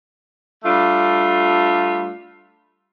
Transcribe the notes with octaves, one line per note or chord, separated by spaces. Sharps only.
G3 A3 D4 F4